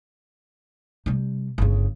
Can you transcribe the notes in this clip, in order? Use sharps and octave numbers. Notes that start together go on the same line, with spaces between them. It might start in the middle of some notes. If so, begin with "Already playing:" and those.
C3 G3
G1 C#3